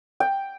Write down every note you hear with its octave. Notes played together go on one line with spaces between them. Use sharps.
G5